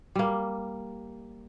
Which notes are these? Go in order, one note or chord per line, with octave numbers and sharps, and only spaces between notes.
G3 A#3